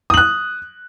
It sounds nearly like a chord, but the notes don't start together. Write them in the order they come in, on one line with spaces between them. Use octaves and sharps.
D#6 F#7 F#6